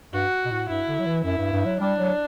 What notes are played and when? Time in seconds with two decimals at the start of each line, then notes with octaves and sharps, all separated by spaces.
0.13 G2 F#4
0.45 B2
0.51 A2
0.69 G2 E4
0.87 D3
0.99 F#3
1.06 E3
1.24 F#2 E4
1.38 G2
1.53 G2
1.66 F#3
1.80 G3 D4
1.99 F#3